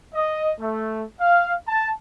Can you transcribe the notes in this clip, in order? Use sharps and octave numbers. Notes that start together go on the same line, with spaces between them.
D#5
A3
F5
A5